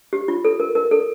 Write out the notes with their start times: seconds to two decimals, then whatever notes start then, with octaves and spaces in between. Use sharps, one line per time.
0.13 G4
0.28 F4
0.45 A4
0.60 A#4
0.75 A#4
0.91 A4